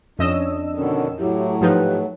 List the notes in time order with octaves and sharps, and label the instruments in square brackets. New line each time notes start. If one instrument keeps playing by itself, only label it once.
[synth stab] F2 D#5 E6 [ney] C#4 [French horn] D4
[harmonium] B2 D3 D#3 [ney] C#4
[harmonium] A2 F#3 [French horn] E4 [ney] G4
[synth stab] G#2 F3 D#4 [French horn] G4 [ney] B4